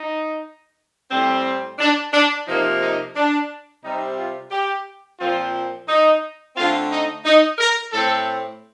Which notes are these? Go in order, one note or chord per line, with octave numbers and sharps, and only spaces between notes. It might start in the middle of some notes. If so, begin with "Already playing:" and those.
Already playing: D#4
A2 G3 C4
D4
D4
C3 F3 A#3 D#4
D#4
D4
C3 G3 C4 D#4
F4
G4
A#2 F3 C4 F4
D#4
D3 A3 C4 F4
D#4
D#4
A#4
A2 A3 C4 A4